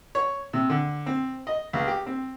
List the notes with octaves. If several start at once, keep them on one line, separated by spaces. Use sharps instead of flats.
C#5
C3
D3
C4
D#5
C#2
G4
C4